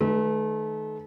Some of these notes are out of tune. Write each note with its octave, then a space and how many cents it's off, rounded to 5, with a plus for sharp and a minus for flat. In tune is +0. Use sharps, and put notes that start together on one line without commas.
D#3 -25 A3 -35 B4 +0